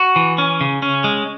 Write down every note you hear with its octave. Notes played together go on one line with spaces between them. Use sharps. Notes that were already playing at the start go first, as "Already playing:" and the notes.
Already playing: F#4
E3
C#4
C#3
C#4
G#3